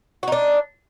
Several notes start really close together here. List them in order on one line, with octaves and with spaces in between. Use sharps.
F#4 D#4 D4